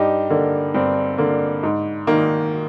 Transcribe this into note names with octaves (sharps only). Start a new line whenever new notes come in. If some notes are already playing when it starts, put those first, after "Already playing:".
Already playing: G2 D#4 G4
D3 A#3
G2 C4
D3 A#3
G#2
D#3 A#3